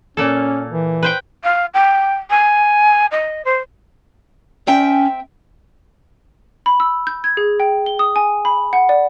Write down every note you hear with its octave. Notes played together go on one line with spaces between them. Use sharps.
A#2 A#3 C#4 A4
E3
B4 C5 G5
F5
G5
G#5
D#5
C5
C4 C#4 E5 G5
B5
E6
G6
G#6
G#4
G5
G7
D#6
G#5
B5
F#5
D5